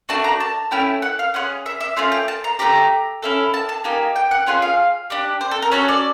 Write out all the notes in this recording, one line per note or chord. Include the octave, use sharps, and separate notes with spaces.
A3 D4 F#4 A5
A#5
A5
A3 C#4 E4 G5
F#5
F5
C#4 F4 G#4 F#5
E5
E5
A3 C#4 F4 F5
G5
A5
A#5
A3 D4 G4 A#5
C#4 E4 A4
A5
A5
A#3 D#4 G4 G#5
G5
F#5
C#4 F4 G#4 F#5
F5
D4 G4
C5
A4
A#4
C#4 F#4 A4 C#5
D5